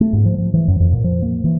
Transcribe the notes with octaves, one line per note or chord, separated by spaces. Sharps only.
A3
G#2
F3
F3
E3
F#2
F2
A#2
F3
A#3
E3